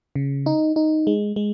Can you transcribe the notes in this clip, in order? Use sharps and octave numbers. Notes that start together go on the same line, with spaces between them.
C#3
D#4
D#4
G#3
G#3